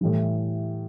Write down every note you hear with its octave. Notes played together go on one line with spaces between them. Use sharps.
A2 E3 G3